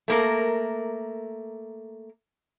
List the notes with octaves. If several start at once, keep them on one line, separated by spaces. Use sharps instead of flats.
A3 A#3 A#4